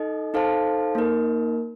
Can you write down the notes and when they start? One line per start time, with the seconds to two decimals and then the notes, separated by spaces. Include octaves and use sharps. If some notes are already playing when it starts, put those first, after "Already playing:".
Already playing: D#4 A4 D#5
0.34 D#4 A4 C5 F5 A5
0.95 A#3 D#4 A#4